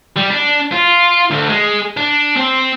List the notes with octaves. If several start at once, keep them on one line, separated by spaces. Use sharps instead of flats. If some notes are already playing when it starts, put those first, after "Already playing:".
G3
D4
F4
D2
G#3
D4
C4